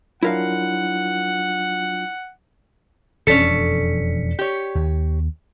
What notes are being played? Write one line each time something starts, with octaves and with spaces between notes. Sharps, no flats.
F#3 D4 E4 F4 A#4 F5 F#5
E1 F2 C#4 D4 A4 D5 B6 C#7
G4 C#5
D#2